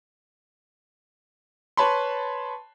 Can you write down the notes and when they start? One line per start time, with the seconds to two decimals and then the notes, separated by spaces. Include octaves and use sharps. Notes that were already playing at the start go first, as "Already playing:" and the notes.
1.77 B4 C#5 A5 B5 C6